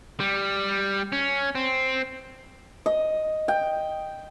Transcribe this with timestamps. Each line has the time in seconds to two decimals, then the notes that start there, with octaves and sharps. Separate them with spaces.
0.20 G3
1.12 C#4
1.55 C4
2.86 D#5
3.48 G5